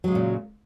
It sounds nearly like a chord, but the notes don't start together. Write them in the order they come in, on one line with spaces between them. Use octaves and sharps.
F#3 G#3 C#3 A#2